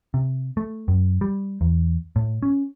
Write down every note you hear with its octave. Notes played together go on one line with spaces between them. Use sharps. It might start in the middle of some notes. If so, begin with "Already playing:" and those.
C3
A3
F#2
G3
E2
A2
C#4